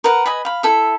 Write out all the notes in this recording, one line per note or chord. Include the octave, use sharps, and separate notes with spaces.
A#4 B4 F#5
B4 D#5 G#5 B5
F5 B5
E4 A4 E5